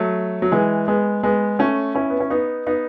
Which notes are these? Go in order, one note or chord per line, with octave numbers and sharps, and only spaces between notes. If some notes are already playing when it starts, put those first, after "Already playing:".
Already playing: F#3 A3
F#3
E3 G#3
G#3 B3
G#3 B3
A3 C#4
C#4 E4
B3
C#4
B3 D#4
B3 D#4